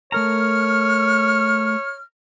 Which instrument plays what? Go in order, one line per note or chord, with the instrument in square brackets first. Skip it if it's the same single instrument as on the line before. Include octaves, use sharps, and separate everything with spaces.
[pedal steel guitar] A3 A#4 A#5 [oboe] C#5 [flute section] F6